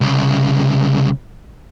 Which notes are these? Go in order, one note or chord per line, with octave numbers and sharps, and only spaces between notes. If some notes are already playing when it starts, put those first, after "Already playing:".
C2 C#3